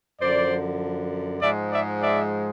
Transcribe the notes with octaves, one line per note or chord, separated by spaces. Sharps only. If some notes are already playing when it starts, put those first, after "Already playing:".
F#2 D3 F3 C5 D5
G#2 F3 G#3 D5 E5
D5 E5
D5 E5